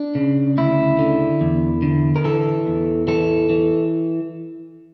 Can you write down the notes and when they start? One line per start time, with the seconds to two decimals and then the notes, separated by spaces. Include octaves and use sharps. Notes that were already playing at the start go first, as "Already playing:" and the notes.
Already playing: D4
0.15 C#3
0.57 D2 E4
0.99 D3
1.41 E2
1.82 D3
2.16 A#4
2.24 E3 A4
2.67 E2
3.08 E3 A4
3.50 E3